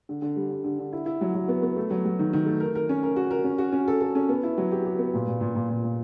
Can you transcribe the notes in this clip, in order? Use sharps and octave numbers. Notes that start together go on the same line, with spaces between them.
D3
D3
G3
D3
D3
D3
E4
E4
F#3
F#3
B3
B3
A3
F#3
F#3
D#3
D#3
A3
A#4
A#4
C#4
A#4
F#4
A#4
C#4
F#4
C#4
A4
A4
C#4
B3
E4
F#3
G4
G4
B3
A#2
A#2
A#2
A#2
A#2
A#2